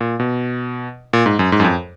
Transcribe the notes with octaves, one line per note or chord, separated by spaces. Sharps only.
A#2
B2
A#2
G#2
F#2
G#2
F#2
F2